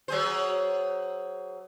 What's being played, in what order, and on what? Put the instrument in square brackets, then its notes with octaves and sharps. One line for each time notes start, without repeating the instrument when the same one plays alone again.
[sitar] F#3 G#4 C5